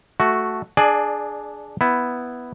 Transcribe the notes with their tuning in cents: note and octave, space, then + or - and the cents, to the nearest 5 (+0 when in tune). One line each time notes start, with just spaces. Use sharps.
A3 +0 F#4 +0
D4 +0 G#4 +10 D5 +25
B3 +0 E4 +0